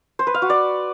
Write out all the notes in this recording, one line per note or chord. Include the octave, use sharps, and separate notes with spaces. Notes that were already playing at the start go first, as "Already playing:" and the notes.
C5
B4
F5
F#4
D5